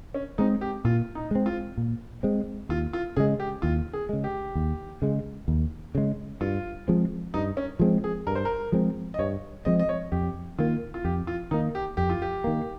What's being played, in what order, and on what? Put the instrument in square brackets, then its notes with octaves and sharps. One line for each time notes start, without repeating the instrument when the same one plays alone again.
[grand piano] C#4
[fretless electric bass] G#3 C4 [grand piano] D#4
[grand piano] G4
[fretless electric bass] A#2 [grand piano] F4
[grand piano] D#4
[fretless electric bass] G#3 C4
[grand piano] F4
[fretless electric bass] A#2
G#3 C4
[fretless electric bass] D#2 [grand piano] F4
[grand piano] F4
[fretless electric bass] C#3 G#3 [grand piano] G#4
[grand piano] G4
[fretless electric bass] D#2 [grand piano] F4
[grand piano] G#4
[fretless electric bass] C#3 G#3
[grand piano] G4
[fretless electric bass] D#2
C#3 G#3
D#2
C#3 G#3
[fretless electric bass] G2 [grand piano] F4
[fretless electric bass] F3 G#3 C4
[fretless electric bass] G2 [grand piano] D#4
[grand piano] C#4
[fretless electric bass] F3 G#3 C4
[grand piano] G#4
[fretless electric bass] G2 [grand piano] A#4
[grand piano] C5
A#4
[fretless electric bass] F3 G#3 C4
[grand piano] D#5
[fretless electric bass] G2 [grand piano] C#5
[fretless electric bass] F3 G#3 C4 [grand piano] D#5
[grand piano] D#5
C#5
[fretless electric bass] F2 [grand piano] G4
[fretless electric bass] D#3 A#3 [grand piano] F4
[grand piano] F4
[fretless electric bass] F2 [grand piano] G4
[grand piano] F4
[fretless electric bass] D#3 A#3 [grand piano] D#4
[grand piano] G4
[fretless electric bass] F2 [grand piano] G4
[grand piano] F4
G4
[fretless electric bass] D#3 A#3